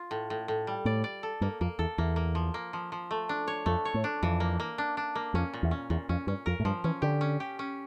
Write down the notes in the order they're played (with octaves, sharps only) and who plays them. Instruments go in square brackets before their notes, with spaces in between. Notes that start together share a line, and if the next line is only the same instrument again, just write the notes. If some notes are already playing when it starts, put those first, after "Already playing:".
Already playing: [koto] F4
A2
A2
A2
G3
[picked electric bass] A2 [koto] D5
[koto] D5
A4
[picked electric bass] G2 [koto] A#3
[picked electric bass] F2 [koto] A#3
[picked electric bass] E2 [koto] A4
[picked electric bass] E2 [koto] A#3
[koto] A#3
F3
A#3
F3
F3
A3
D4
C#5
[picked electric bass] F2 [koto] A3
[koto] C#5
[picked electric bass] A2
[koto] D4
[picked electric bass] F2 [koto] E3
[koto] A#3
A#3
D4
D4
A#3
[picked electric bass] F2 [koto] C#4
[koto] A#2
[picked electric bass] E2
[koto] C#4
[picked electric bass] E2 [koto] A#2
[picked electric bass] F2 [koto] C#4
[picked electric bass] G2 [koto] C#4
[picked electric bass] F2 [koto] A#4
[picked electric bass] A2
[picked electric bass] G2 [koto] F3
[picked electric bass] E3 [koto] C#4
[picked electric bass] D3 [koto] G4
[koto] C#4
G4
C#4